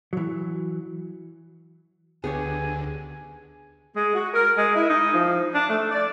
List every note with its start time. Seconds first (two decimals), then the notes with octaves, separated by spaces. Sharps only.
0.13 E3 F#3
2.24 D2 B3 G4 G#4 C#5 G#5
3.95 G#3
4.14 F#4
4.33 A#4
4.57 G#3
4.75 E4
4.89 D#4
5.13 F3
5.54 D4
5.69 A3
5.91 D5